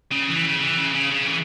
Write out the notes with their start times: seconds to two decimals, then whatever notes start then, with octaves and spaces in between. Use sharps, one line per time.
0.12 C#3
0.28 E3
0.44 C#3
0.60 E3
0.77 C#3
0.94 C#3
1.10 C#3
1.25 E3